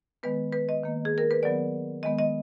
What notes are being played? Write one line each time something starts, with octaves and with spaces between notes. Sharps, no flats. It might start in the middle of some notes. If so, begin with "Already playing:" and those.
D#3 G#3 B3 B4
B4
D#5
D#3 A#3
G#4
A#4
B4
D#3 F#3 B3 D5
D#3 G#3 B3 D#5
D#5